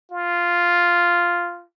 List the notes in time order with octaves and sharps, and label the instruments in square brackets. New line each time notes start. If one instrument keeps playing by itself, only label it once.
[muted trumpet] F4